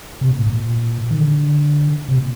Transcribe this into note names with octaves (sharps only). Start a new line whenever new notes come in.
C3
A#2
A2
A#2
D#3
D3
C3
A#2